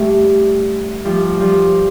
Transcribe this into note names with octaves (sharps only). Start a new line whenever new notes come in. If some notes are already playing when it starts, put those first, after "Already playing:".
Already playing: G3 A3
F3 G3
F3 G3